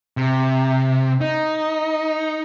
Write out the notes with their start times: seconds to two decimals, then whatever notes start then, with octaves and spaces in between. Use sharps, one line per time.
0.17 C3
1.21 D#4